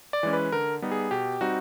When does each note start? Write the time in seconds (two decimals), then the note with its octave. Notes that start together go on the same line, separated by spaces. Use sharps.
0.13 D5
0.23 E3 G#3 C#4
0.33 B4
0.52 D3 A#4
0.82 G3 B3 D#4
0.92 G#4
1.11 B2 G4
1.41 G3 C4 D#4 F#4